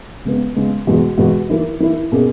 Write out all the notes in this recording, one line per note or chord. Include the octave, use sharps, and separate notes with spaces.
C#3 G#3 B3
C#3 G#3 B3
E2 B2 G#3 B3 F#4
E2 B2 G#3 B3 F#4
E3 A#3 E4
E3 A#3 E4
B2 A#3 C#4 G#4